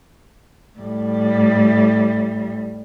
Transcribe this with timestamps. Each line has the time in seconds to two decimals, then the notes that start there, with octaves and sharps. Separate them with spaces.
0.79 A2 G3